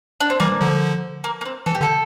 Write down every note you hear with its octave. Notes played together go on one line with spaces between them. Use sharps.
D4
C4
E3 G3 A#3
D3 F3
A#3
A#3
C4
E3 A4
G4
D3 A4